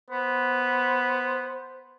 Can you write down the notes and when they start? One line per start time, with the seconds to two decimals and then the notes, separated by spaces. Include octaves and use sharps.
0.10 B3 C5